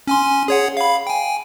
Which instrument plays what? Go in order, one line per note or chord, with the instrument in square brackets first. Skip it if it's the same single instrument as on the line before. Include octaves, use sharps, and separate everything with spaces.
[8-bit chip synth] C#4 G#5 C6
G#4 C#5 F#5
F5 B5
G5 G#5